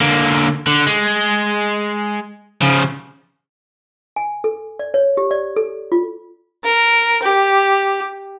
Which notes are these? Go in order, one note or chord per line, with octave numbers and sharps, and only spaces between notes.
D3 A#3
D3
G#3
C#3 F3
G#5
A4
D5
C#5
G4
D5
A4
F4
A#4
G4